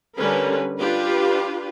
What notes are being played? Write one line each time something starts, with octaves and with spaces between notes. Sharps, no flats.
D3 G3 C#4 A#4 B4
D4 F4 G4 B4